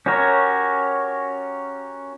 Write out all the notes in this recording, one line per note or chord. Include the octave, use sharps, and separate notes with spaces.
C#4 F#4 G4 A#4 C#5